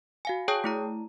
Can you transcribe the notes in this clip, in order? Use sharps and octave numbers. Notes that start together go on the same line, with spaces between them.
F#4 F5 G#5
G#4 C#5 G5 A5 D#6 G6
A3 E4 A#5